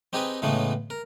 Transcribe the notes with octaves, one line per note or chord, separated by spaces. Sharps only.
C4 D#4 G4 G#4 B4
A2 C#3 E3 G#3 A3 B3
A#4